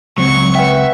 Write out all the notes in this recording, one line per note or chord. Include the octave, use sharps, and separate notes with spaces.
C#2 F#3 C4 C#6
B4 E5 F#5 G5